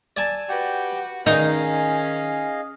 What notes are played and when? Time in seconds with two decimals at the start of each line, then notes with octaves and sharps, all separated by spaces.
0.17 D5 G#5 A5 E6
0.49 F#4 G4 B4 G5
1.26 D#3 C#4 D#4 G#4 D#5 F5